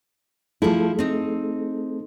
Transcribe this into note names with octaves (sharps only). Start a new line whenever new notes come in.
F3 A3 E4 G#4 A4
C4 D#4